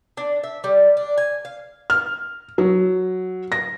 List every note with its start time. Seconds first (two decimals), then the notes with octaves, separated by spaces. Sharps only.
0.17 D4
0.44 E5
0.64 G3
0.97 D4
1.18 G#5
1.45 F5
1.90 F6
2.58 F#3
3.52 A#6